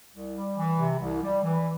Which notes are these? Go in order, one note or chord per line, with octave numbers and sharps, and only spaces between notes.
C2
G3
E3
C3
C2
G3
E3